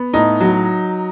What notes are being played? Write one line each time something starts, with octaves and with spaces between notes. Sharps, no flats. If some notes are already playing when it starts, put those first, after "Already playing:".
Already playing: B3
A2 D#4
F#3